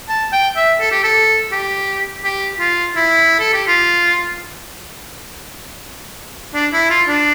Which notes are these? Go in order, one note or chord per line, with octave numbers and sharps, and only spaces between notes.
A5
G5
E5
A4
G4
A4
G4
G4
F4
E4
A4
G4
F4
D4
E4
F4
D4